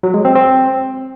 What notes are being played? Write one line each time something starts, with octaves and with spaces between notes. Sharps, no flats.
F#3
G#3
C4
C4